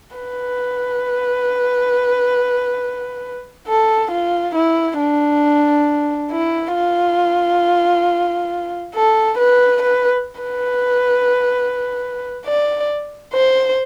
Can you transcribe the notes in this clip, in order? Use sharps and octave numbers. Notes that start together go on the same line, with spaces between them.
B4
A4
F4
E4
D4
E4
F4
A4
B4
B4
B4
D5
C5